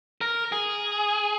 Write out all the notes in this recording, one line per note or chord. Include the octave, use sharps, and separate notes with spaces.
A#4
G#4